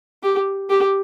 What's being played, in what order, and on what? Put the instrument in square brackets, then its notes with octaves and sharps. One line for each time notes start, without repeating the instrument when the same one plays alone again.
[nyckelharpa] G4
G4